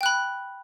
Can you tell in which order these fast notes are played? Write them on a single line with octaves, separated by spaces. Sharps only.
G5 F#6 B5